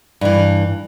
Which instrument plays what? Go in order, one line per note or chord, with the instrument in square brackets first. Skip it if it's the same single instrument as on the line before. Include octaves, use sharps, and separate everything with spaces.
[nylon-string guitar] G2 E3